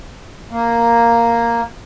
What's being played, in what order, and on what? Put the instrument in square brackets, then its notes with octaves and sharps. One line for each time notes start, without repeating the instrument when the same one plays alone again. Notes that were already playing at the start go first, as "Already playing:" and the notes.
[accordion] A#3